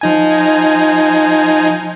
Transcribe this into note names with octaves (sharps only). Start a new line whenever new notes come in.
F3 D#4 G#5